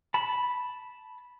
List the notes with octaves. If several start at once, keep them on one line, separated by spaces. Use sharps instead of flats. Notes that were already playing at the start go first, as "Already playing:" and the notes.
A5 B5